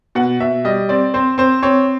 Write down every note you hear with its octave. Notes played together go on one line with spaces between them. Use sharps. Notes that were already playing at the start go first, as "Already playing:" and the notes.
B2 F#5
B2 E5
G3 D#5
C4 D5
C4 C5
C4 C5
C4 C#5